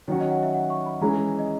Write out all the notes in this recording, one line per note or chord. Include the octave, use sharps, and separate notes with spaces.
D#3 F#3 C#4 F#4 C#5
D#5
F#5
E5
F#5
C#6
B5
E3 G#3 C#4 A#5
D#5